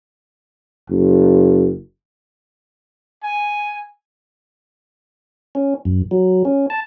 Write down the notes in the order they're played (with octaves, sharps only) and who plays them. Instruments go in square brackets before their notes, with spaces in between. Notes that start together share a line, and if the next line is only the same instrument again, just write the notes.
[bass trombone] F#1
[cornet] G#5
[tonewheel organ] C#4
F#2
F#3
C#4
A5